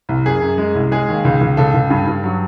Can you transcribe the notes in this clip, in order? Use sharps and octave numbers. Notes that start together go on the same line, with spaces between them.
C2
F#2 G#4
F#2
G#3
C2
G#3 G#4
D#2
C#2
C#2
C#2 A4
C#2
G2
G2
F#3